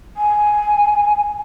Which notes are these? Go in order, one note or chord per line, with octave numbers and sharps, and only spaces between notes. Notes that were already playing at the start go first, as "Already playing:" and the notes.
G#5